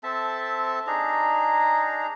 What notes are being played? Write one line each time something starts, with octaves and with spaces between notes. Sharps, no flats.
C4 A4 E5 A5
D4 D#4 G#4 A#5